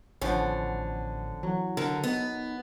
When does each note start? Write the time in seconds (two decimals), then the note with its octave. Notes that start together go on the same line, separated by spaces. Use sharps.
0.21 A1 D3 F3 B3 C#4
1.43 E3 F#3
1.77 D3 A#4
2.04 B3 D#4